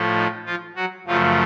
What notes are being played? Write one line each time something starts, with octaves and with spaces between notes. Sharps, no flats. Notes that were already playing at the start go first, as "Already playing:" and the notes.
Already playing: A2 F3 A3
D#4
F3 F4
F#3 F#4
F#2 C#3 F3 A3 F4